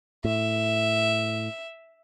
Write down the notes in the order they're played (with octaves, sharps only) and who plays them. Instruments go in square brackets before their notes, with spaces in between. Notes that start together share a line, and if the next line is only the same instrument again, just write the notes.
[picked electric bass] A2 [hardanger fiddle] E5